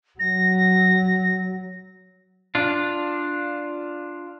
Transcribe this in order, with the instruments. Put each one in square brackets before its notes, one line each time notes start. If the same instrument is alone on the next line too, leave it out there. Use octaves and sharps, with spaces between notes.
[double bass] F#3 [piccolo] A#6
[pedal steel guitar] D4 F4